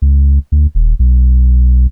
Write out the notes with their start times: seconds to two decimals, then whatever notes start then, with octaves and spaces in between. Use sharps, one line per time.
0.02 C#2
0.52 D2
0.75 D#1
0.99 B1